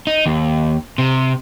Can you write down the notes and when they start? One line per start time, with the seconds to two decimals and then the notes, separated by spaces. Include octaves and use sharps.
0.07 D#4
0.26 D#2
0.98 C3